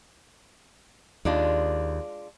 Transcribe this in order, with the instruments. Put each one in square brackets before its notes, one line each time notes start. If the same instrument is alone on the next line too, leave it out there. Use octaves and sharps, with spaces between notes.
[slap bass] D#2 [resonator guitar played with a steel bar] G#3 D4 F4